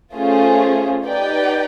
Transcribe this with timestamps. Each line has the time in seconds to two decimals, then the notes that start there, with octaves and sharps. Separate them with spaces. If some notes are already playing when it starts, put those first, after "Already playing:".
0.15 A3 C#4 F4 G#4 C5
1.05 D#4 G4 B4 D5 G5